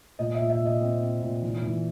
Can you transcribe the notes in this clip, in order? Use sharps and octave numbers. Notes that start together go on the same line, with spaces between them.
A#2 D#5
E5
A#2
E5
A#2
D#5
C4
C4
A#2
E3
E3